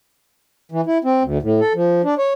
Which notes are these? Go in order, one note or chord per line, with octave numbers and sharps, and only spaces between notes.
E3
E4
C4
D2
A2
A4
F3
D4
C#5